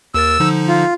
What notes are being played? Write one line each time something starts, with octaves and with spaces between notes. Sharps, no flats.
D#2 A#4 E6 A6
D3 F3 D#4
F4